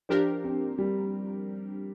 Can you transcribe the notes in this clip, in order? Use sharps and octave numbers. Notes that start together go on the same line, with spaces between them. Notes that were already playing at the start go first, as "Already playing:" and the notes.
F3 D4 G4 A#4 C5
C4
G3